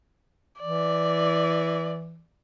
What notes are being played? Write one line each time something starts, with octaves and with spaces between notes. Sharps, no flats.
E3 D5